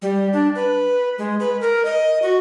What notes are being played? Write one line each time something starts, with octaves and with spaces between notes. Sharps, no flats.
G3
D4
B4
G#3
B4
A#4
D#5
F#4